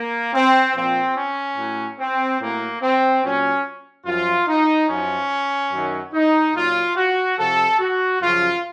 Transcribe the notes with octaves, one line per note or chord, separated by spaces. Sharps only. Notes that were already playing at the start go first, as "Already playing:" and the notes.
Already playing: A#3
C4
A#2 F3 C4
C#4
A2 F#3
C4
A2 F#3 A#3
C4
A#2 F#3 C#4
F#2 F3 F4
D#4
F#2 F3 C#4
F#2 D#3 F#3
D#4
A#2 F#3 F4
F#4
C3 F3 A4
F#4
F#2 C#3 F3 F4